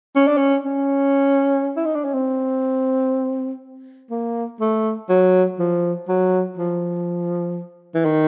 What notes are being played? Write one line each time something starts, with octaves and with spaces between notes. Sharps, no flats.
C#4
D4
C#4
C#4
E4
D#4
D4
C#4
C4
A#3
A3
F#3
F3
F#3
F3
E3
D#3